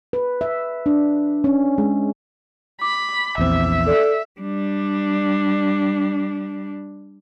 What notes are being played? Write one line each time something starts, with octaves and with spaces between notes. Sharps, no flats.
B4
E5
D4
C#4
G#3
B5 D6
A#1 E2 C4 E5
A4 D5
G3 D4